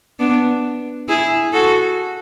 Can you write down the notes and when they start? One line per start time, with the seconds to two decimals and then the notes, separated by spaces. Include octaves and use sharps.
0.19 B3 D4
1.09 E4 G#4
1.53 F#4 A4